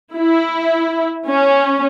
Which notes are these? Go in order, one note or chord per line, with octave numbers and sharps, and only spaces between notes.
E4
C#4